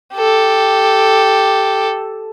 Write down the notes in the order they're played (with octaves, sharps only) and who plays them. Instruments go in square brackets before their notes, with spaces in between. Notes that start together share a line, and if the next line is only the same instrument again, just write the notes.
[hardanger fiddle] G4 A4